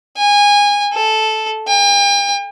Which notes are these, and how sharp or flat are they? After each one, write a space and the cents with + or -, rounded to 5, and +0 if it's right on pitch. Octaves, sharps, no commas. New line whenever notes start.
G#5 -25
A4 -10
G5 +45